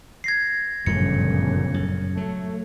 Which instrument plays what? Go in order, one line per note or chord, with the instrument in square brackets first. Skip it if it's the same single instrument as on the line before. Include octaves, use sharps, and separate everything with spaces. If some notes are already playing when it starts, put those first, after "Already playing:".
[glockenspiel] G#6 A#6 C7
[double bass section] G1 A#2 C#3 [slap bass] F#2 F3 A3 [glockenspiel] C#7
[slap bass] F#2
[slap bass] F#3 [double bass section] A3